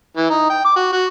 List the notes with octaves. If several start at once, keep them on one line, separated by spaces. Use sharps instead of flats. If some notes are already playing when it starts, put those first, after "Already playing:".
E3
D#4
G5
D6
F#4
F#4